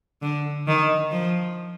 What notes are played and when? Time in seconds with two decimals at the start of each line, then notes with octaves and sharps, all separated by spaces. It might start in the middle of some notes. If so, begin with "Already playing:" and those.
0.22 D3
0.67 D#3
1.11 F3